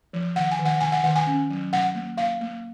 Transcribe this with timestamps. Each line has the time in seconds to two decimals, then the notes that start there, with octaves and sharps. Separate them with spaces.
0.13 F3
0.35 D#3 F#5
0.51 G#5
0.59 D#3
0.65 F#5
0.81 D#3 G#5
0.92 F#5
1.03 D#3 F#5
1.16 G#5
1.27 C#4
1.50 F#3
1.72 F#3 F#5
1.95 A#3
2.17 A#3 F5
2.41 A#3